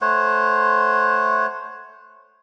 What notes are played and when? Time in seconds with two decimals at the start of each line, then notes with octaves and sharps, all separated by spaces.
0.01 A3 C5 C#5 F#5